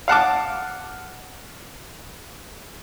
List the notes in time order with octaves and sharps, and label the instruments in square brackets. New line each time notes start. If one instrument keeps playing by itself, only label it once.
[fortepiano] F5 F#5 A5 D6